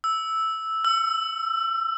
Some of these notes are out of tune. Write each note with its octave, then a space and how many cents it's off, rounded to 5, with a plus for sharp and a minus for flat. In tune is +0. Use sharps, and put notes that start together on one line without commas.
E6 -5
E6 +30